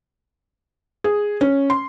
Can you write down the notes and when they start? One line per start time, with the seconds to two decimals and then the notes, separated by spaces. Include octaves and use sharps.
1.04 G#4
1.41 C#4
1.70 C6